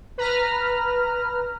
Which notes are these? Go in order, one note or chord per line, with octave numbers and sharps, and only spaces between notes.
B4 A#5 F6